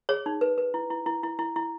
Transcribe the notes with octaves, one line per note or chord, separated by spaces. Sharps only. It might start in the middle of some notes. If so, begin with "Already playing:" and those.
G#4 C#5
D#4
B4
B4
E4
E4
E4
E4
E4
E4